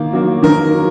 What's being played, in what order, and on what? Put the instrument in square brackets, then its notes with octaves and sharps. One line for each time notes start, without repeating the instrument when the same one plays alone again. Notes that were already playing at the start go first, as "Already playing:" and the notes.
Already playing: [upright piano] D#3 A#3
F#3 A#3
D#3 A#4
F#3